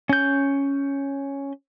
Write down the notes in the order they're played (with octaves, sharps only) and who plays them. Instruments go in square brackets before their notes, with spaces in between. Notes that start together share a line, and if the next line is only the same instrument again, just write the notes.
[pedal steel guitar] C#4 G6